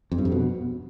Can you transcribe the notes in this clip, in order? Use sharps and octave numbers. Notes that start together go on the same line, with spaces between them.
F2
G2
F2
B2